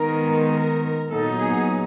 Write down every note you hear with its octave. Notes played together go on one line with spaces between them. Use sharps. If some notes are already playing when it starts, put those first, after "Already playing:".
Already playing: D#3 G#3 B3 D#4 A#4
A#4
A#2 F#3 B3 D#4 A4
G#4